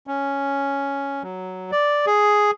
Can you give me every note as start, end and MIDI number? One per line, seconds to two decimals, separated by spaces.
0.07 1.23 61
1.23 1.71 54
1.72 2.06 74
2.06 2.51 68